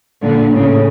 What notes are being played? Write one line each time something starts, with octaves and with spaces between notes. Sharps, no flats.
A#2 D3
A2 C#3